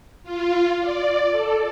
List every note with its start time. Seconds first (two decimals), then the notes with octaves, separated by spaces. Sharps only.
0.24 F4
0.81 D5
1.31 A4